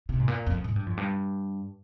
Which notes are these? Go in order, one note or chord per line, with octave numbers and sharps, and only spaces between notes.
C3
G#2
A#2
F2
G#2
G2
F2
G2